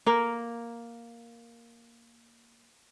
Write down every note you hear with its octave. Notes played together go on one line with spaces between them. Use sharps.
A#3 A#4